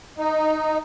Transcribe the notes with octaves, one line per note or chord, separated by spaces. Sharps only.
D#4